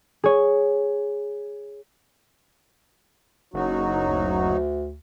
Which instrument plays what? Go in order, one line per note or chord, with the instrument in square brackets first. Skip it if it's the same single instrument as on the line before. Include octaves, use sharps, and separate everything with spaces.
[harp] G#4 C#5
[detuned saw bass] F#1 [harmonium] F#3 D#4 F#4
[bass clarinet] D2